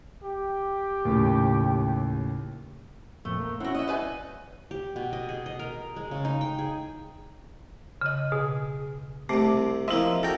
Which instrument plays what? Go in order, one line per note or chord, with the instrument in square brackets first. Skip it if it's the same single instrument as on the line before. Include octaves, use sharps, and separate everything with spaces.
[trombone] G4
[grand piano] D#2 A2 C#3
[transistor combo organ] F2 A#2 [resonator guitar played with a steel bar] A3
[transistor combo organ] A#3
[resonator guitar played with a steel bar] C4 F#4 [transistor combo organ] C#4 E4 F#5
[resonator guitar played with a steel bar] D#5 E5
G3 B4 G#5
[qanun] G4
B2
D#5
G#4
D#5
A#4
G#3
C#3
D#4
G5
G#4
[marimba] C#3 D#5
[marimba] B2 [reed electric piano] G#4
[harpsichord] C2 C3 [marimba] A3 [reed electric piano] D6
[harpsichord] F3 A#3 [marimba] C4 E4 [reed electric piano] D#5 E5
[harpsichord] F#4 A#4 [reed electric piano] A4 G5